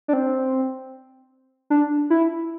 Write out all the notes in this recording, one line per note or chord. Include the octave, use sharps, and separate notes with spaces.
D4
C4
D4
E4